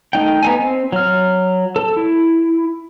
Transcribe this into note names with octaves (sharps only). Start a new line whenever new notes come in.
A3 D#4 G5
B3 D#4 G#5
C4
F#3 F6
A4
E4